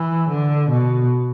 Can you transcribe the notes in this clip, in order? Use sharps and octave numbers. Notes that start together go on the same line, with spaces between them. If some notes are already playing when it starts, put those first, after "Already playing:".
Already playing: E3
D3
B2